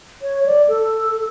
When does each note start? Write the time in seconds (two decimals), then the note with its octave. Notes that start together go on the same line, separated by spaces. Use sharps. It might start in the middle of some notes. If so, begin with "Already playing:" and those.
0.22 C#5
0.46 D5
0.68 A4